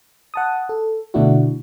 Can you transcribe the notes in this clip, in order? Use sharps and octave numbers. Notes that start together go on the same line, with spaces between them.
F#5 A5 D#6
A4
B2 D3 A3 D4 E4 F#4